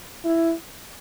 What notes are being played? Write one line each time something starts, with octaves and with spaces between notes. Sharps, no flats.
E4